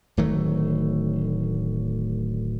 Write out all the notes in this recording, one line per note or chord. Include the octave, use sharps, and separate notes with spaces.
D1 D#3 F#3 A3